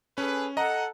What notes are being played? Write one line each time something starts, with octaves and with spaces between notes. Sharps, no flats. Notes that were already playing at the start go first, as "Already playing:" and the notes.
C#4 G#4 A4 B4
A4 D#5 F#5 A#5